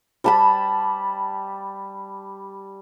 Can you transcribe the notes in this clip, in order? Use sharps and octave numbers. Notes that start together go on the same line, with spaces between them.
G3 A5 B5